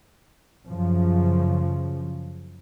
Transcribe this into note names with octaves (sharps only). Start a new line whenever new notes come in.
F#2 C#3 F3